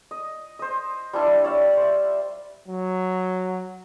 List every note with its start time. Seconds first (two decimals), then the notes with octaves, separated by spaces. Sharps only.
0.11 D#5
0.59 C5 D#5
1.13 G3 D4 E4 C6
1.44 C#5 D5 E5 F5
1.77 C5 E5
2.68 F#3